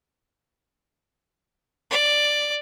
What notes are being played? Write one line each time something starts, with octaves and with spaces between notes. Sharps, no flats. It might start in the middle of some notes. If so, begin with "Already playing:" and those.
D5